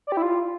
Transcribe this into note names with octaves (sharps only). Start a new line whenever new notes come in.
D5
G4
E4
F4